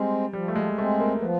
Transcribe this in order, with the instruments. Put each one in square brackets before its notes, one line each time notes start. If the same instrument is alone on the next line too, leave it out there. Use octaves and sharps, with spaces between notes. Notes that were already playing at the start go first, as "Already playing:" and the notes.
Already playing: [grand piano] G3 [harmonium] G#3 C4
[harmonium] F3 [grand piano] G3
[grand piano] A3
G#3
[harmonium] G#3 C4 [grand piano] A3
[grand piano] A#3
[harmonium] F3 [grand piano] B3